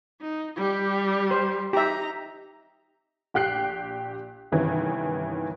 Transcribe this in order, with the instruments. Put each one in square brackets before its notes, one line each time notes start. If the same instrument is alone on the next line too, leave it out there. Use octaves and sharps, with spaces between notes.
[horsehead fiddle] D#4
G3 G4
[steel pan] C5
[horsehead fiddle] D#4 A#5 [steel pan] G4 E5
[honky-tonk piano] A#1 G4 G5 F#6 C7
G1 C3 D#3 E3 C#4